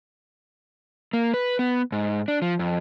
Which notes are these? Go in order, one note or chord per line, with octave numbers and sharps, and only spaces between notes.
A#3
B4
B3
G#2
D4
F3
F2